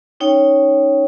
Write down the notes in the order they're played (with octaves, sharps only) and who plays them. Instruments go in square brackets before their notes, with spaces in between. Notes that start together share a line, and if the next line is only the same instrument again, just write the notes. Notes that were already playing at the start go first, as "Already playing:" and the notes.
[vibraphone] C#4 D#4 C#5 G5